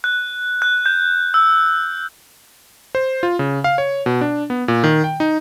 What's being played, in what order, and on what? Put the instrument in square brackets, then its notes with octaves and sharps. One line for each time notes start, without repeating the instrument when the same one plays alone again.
[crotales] F#6
F#6
G6
E6
[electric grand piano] C5
F4
C#3
F5
C#5
B2
D4
B3
A#2
D#3
G5
D#4